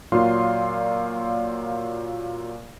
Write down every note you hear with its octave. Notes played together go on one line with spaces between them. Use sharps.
A#2 F#3 F4 D5 F5 C6